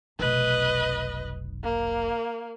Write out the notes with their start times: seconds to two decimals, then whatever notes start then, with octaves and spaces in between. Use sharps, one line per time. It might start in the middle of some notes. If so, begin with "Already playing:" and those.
0.19 F1 B1 B4 D#5
1.64 A#3